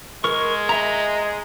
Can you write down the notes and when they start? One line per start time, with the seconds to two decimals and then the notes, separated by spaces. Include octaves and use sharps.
0.24 G#3 A#4 C#6
0.69 D#5 E5 A#5